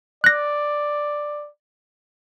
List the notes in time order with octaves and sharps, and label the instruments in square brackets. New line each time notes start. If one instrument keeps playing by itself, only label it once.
[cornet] D5 [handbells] F#6 A#6